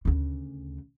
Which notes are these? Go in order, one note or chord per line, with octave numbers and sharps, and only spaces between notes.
D2 C#3